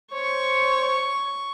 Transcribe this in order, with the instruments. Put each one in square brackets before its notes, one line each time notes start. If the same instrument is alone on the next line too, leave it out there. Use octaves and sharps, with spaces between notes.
[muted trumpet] C5 [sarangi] C#5 [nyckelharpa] C#6